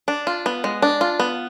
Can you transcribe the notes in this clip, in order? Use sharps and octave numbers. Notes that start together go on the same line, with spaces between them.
D4
F4
B3
G#3
D4
F4
B3